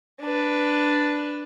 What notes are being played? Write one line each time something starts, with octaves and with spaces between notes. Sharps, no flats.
D4 B4